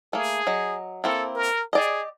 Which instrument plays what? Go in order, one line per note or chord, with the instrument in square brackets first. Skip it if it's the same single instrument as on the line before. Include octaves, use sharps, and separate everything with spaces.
[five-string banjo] A3 A#3 [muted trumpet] G#4
[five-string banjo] F#3 D#5
[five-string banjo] A#3 C4 E4 [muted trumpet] A4
[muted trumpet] A#4
[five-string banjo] G4 D5 D#5 [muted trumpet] G#4